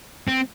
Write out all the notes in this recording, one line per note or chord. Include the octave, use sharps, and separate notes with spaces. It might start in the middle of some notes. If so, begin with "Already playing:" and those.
C4